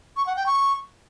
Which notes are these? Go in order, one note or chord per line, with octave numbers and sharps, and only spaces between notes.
C#6
F#5
G5
C#6